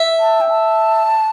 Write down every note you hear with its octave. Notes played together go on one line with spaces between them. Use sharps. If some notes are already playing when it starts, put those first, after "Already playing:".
Already playing: E5
A5
G5
A5